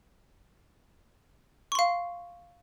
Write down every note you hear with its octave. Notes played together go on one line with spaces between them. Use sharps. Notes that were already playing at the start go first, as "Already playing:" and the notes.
F5 C6 C#6